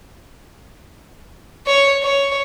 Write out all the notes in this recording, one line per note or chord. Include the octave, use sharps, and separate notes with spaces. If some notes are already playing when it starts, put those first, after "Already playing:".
C#5
C#5